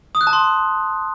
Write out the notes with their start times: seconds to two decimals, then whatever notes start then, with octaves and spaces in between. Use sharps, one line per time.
0.15 D#6
0.21 F#6
0.27 A5
0.33 C6